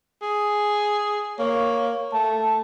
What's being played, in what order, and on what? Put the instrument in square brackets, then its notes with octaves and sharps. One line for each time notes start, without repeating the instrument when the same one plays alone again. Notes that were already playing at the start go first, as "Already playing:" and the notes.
[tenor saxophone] G#4
[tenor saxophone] A#3 [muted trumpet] C#5
[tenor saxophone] A3 [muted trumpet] A5